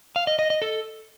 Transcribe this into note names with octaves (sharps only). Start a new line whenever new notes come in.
F5
D#5
D#5
D#5
A4